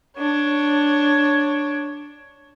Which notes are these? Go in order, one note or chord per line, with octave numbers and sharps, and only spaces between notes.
D4 C#5